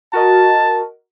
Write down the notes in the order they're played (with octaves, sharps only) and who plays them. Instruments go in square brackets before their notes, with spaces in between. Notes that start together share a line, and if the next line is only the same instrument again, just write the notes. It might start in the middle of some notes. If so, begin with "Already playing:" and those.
[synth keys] F#4 A#4 D#5 [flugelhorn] A5